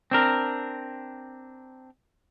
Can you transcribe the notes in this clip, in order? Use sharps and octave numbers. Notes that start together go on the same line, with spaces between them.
C4 D4 A#4